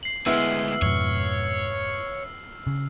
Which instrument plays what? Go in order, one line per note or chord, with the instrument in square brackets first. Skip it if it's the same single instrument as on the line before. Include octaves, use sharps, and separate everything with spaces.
[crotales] C7 F#7
[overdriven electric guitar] D2 G#3 [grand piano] B3 E4 [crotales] E6 F6
[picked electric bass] F2 G#2 B2 [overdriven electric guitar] C#5
[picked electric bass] C#3